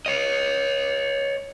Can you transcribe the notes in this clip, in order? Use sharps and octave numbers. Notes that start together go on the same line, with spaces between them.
C#5 D#5